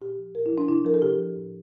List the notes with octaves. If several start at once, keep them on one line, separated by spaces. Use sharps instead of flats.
A#2 G4
F3
A#2 A#4
E4
F3
D4
C3 E4
F3 A#4
A4
C3 G4
F3
A2